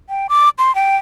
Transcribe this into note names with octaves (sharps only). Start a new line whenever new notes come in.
G5
D6
C6
G5